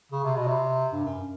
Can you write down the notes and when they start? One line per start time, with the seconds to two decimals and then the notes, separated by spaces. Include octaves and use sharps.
0.12 C#3
0.24 C3
0.36 B2
0.47 C3
0.92 G2
1.04 F#2